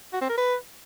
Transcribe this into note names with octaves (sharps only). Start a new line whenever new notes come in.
F#4
C4
A#4
B4